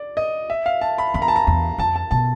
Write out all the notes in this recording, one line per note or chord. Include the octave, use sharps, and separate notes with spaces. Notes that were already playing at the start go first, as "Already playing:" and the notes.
Already playing: D5
D#5
E5
F5
A5
B5
E2 B5
A#5
A5
A#5
E2
F2 A5
A5
B2 A5